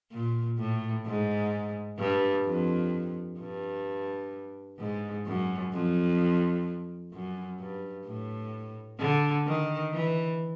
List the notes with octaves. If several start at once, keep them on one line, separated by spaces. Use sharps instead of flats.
A#2
A2
G#2
G2
F2
G2
G#2
F#2
F2
F#2
G2
A2
D3
D#3
E3